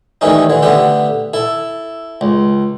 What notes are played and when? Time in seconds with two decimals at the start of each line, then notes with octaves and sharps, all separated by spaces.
0.21 D#3 E3 G3 A3 C#4 D#4
0.50 D3 E3
0.62 D3 A3 B3 G4
1.34 E4 A4
2.21 C#2